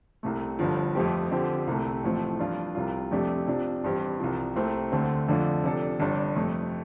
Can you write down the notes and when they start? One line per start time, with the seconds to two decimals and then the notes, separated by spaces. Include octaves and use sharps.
0.23 C2 C3 A3
0.59 G1 G2 D3 F3
0.95 F2 F3 A3 C4 G4
1.31 F2 D3 F3 C4 G4
1.67 C2 C3 A3
2.04 A1 A2 F3 A3 C4
2.39 G2 F3 D4 F4
2.75 C2 C3 G3 F4
3.11 F2 C3 A3 D4 G4
3.47 C3 F3 D4
3.84 A1 G2 G3 C4 G4
4.19 C2 C3 F3
4.56 C2 C3 A3 C4
4.92 D2 D3 A3 C4
5.28 F2 D3 A3 D4 F4
5.64 C3 F3 D4 A4
6.00 G1 G2 G3 D4
6.36 F2 C3 A3